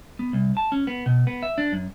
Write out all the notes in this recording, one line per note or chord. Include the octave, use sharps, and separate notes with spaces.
B3
C2
A5
C#4
B3
B2
B3
E5
D4
F#2